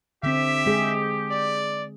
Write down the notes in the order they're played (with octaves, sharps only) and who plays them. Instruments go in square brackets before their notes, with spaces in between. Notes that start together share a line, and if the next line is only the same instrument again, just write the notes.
[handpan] D3 C4 [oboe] G4 [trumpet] E5
[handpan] G#3 G#4
[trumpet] D5